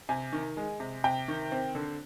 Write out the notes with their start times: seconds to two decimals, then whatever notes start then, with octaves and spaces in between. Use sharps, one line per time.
0.09 C3 G#5
0.33 D#3
0.57 G#3
0.80 C3
1.04 C3 G5
1.28 D#3
1.52 C4
1.75 D3